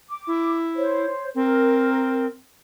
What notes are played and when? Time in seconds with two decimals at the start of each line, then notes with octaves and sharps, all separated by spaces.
0.09 D6
0.27 E4
0.76 C5 C#5
1.35 C4 A#4